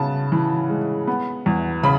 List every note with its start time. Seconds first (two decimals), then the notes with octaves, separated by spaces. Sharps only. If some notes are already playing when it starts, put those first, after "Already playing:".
Already playing: C#3 B3 A5
0.32 E3
0.70 G#3
1.07 B3
1.46 E2
1.83 C#3 B5